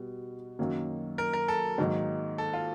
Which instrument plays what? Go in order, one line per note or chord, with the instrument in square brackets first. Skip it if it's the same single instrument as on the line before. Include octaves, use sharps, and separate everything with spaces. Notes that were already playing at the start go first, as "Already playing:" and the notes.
Already playing: [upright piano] B2 G3 B3
F#2 D#3 F#3 A#3
[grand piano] A#4
A#4
A4
[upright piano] G#2 D#3 F#3 A#3 D#4
[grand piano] A4
F4